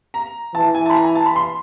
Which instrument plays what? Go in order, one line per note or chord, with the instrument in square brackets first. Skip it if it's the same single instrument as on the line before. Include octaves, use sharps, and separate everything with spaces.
[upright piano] A#5
[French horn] E3 [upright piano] A5
[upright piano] G#5
A5
B5
A#5
G#5
A5
B5
C6